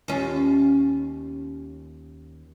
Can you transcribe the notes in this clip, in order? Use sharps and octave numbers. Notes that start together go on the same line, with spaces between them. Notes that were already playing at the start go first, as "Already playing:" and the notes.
D#2 C#4 F4